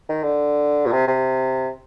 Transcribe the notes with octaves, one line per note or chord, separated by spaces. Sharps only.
D#3
D3
A#2
C3
C3